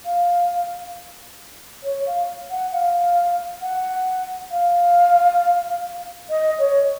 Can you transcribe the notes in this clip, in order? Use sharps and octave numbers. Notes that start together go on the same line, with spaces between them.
F5
C#5
F5
F#5
F5
F#5
F5
D#5
C#5